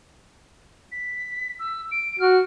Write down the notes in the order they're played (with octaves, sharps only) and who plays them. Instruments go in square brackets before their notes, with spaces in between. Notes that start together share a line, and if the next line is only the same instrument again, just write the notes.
[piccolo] B6
E6
D7
[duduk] F#4 [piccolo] F6